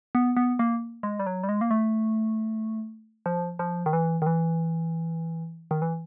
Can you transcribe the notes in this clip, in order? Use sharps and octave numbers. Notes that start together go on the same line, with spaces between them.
B3
B3
A#3
G#3
G3
F#3
G3
G#3
A#3
A3
F3
F3
D#3
E3
D#3
E3
D#3
E3